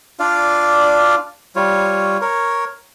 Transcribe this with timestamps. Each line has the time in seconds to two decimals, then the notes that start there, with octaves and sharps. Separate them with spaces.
0.20 D4 F4 D5 F5
1.56 G3 F4 C#5
2.21 A#4 C#5